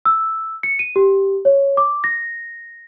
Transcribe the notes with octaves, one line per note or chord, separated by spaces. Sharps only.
E6
C#7
D#7
G4
C#5
D6
A#6